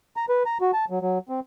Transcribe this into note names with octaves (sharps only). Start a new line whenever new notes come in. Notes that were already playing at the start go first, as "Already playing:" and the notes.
A#5
B4
A#5
F#4
A5
F#3
F#3
C4